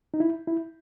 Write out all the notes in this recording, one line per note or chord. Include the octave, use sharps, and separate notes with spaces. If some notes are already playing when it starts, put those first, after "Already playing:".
D#4
E4
E4